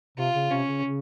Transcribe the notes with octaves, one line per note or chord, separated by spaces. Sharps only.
C3 F4
C#3
C3 C#4
C#3
C#3